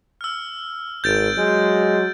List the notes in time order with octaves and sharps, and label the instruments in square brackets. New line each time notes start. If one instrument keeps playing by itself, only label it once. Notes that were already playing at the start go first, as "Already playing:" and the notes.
[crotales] E6 F6
[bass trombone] G#1 [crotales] G6 A6 D7
[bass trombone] F#3 [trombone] G#3